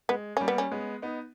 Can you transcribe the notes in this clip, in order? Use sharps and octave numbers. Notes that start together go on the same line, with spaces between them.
G#3 B3
G3 A#3 C#4
B3
C#4
G#3 B3
B3 D#4